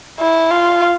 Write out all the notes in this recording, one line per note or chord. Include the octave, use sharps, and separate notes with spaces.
E4
F4